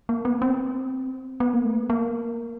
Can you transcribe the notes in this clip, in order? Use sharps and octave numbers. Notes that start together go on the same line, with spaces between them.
A#3
B3
C4
B3
A#3
A3
A#3